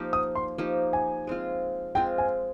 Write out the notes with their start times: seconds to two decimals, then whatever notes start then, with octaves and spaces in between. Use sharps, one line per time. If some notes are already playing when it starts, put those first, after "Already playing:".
Already playing: F3 A#3 C4 D#4 G4
0.13 D#6
0.35 C6
0.58 F3 A#3 D#4 G4
0.93 G#5
1.27 G#3 C4 F4
1.95 G#3 C4 F4 G5
2.18 G#5